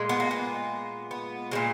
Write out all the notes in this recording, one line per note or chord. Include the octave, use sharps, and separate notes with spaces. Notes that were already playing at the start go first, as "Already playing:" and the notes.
Already playing: A#2 G#3
B3
A#3
B3
B3
A#2 F3 G#3